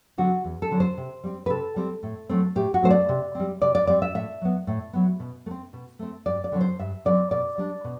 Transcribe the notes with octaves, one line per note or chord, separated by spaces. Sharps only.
D3 F#3 C4 F#4
E2
A4
D3 F#3 C4
C5
C3
G3 C4
B4
C3 A4
G3 C4
A2
F#3 A3 C4
A2 G4
F#4
F#3 A3 C4 C5
D5
C3
G3 C4
C3 D5
D5
G3 C4 D5
E5
A2 E5
F#3 B3
A2
F#3 B3
B2
A3
C4
B2
A3 C4
G2 D5
D5
D3 F#3 C4
C5
G2 E5
D3 F#3 C4 D5
B2 D5
G3 D4
B2